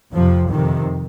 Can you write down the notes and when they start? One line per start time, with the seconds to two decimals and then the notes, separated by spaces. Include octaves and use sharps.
0.14 F2 C3 F3
0.52 F2 C3 D#3